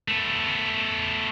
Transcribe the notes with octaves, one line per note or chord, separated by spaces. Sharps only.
A3 B3